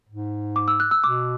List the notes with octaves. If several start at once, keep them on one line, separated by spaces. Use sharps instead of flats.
G#2
D6
E6
F#6
E6
B2 D6